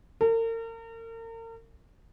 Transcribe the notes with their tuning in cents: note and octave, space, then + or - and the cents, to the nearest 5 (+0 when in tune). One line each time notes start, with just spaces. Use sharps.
A#4 -40